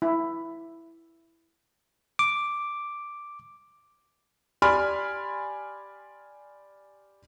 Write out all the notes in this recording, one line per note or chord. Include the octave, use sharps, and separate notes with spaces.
E4
D6
G4 D5 G#5 B5 C6 F6